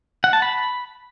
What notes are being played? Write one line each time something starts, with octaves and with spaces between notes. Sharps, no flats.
F#5
A5
B5